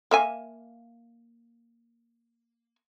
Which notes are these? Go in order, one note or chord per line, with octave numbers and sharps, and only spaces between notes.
A#3 E5 G#5